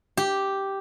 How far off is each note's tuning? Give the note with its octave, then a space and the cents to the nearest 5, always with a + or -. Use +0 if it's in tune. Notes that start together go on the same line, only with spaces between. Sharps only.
G4 -5